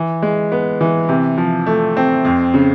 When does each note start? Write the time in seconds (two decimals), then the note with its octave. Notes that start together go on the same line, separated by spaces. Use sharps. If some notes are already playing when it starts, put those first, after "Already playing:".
Already playing: E3
0.22 G#3
0.52 B3
0.81 E3
1.09 C3
1.38 F3
1.66 A3
1.97 C4
2.25 F2
2.54 C#3